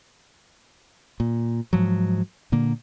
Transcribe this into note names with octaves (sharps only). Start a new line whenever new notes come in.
A#2
G#2 F3 F#3
A#2 D3 A#3